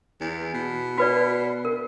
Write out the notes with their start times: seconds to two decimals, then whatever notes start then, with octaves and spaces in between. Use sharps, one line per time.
0.21 E2
0.54 B2
0.98 F#4 B4 D5
1.65 A#4